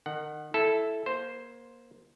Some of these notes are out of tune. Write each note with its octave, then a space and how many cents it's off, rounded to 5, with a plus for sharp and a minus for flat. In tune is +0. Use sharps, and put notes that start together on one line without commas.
D#3 -30 F#5 +10
E4 +0 A4 -10
A#3 +25 C5 +0